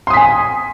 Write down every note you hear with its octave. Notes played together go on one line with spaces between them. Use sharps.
G#5 C6 D#6 B6